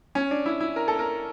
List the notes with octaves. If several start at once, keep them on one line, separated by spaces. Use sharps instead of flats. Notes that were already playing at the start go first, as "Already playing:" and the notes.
C#4
D4
E4
E4
A#4
A4
A#4